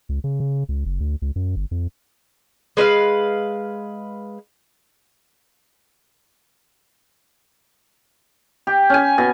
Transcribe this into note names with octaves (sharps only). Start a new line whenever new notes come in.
C#2
C#3
C#3
C#2
F#1
D2
C#2
F#2
G1
F2
G#3 B4 E5 F5
G4
C#4 G#5
B2